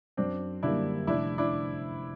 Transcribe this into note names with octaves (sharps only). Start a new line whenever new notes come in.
F#2 C4 D4
D3 G3 A#3 D4 E4
F1 D4 E4
D4 E4